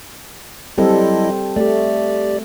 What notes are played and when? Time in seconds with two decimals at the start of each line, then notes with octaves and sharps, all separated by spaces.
0.78 F#3 G3 C4 E4 A4 D#5
1.56 A3 G4 D5